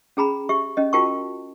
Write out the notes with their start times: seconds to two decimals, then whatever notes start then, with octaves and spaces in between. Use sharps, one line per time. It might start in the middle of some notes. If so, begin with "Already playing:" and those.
0.17 C#4 G#4 A#5 B5
0.49 G4 E5 C#6
0.77 C#4 D#5
0.93 F4 F#4 A#4 G5 A5 C#6